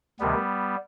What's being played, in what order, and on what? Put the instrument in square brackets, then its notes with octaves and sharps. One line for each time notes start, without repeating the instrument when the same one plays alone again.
[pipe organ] D2 C3 D#3 G3 B3